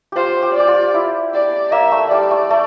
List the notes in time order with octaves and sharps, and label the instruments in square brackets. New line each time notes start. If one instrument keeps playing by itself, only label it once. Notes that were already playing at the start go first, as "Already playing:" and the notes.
[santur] F4 G4 [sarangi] C5
[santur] G4
[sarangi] D5
[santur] G4
F4
E4
[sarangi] D5
[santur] A#3 [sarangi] E5
[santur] A3
[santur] G3 [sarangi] D5
[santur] A3
A3